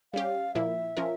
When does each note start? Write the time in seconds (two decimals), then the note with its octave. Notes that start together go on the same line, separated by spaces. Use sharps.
0.13 G3 C#4 G4 F5
0.54 A#2 F3 A#3 E4 E5
0.97 F3 C#4 F4 A#4